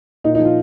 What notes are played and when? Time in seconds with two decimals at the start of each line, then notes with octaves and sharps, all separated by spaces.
0.24 A#2 D#4
0.35 D#4
0.40 F3 F4